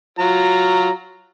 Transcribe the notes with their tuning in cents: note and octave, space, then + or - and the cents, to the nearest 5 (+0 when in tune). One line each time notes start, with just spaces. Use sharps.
F#3 +0 F4 +0 A#5 -5